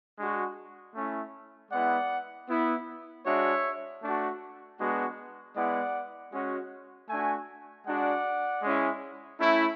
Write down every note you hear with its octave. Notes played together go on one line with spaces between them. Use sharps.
G#3 D4 F#4
A3 C#4 E4
G#3 B3 E4 D5 F#5
B3 E4
G#3 D4 F#4 C#5 E5
A3 D4 F#4
G#3 B3 D4 F#4
G#3 B3 E4 D5 F#5
G#3 C#4 F#4
A3 D4 F#4 E5 G#5
G#3 D4 F#4 D5 F#5
G#3 C#4 E4
A3 C#4 E4